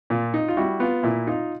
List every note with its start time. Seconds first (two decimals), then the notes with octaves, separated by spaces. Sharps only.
0.10 A#2 F4
0.34 D#4
0.48 F4
0.57 G3 E4 F#4
0.80 B3 F4
1.03 A#2 E4
1.27 D#4 F4